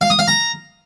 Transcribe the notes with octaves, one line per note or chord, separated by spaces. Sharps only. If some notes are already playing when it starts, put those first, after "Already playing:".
F5
D#6
F5
A#5